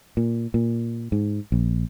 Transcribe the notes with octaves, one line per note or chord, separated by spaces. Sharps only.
A#2
A#2
G#2
A#1